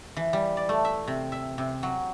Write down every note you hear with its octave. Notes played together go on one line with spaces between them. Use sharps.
E3
G3
D5
A3
E5
C3
E5
C3
F#3